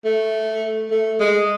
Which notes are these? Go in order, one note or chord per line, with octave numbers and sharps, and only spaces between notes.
A3
A3
G#3